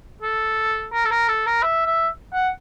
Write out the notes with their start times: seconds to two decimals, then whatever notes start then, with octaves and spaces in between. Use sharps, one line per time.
0.22 A4
0.93 A#4
1.05 A4
1.11 A#4
1.28 A4
1.46 A#4
1.63 E5
1.87 E5
2.33 F#5